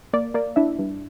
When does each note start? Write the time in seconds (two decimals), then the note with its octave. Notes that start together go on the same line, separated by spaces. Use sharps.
0.13 A#3 D5
0.34 A#3 D5
0.56 D4 E4 E5
0.79 G2